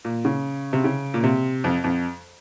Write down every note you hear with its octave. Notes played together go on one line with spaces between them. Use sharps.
A#2
C#3
C3
C#3
A#2
C3
F2
F2